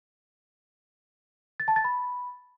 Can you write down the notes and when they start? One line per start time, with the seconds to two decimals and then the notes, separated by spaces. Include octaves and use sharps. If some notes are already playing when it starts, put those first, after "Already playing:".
1.60 A6
1.68 A5
1.76 A6
1.84 B5